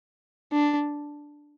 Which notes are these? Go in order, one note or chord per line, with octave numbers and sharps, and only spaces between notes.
D4